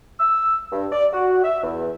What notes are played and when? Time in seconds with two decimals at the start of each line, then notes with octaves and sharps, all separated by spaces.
0.20 E6
0.72 G2
0.92 D5
1.12 F#4
1.44 E5
1.63 E2